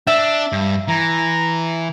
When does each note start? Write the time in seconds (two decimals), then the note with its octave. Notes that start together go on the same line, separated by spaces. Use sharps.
0.07 D4 E5
0.52 G2
0.88 E3 A#5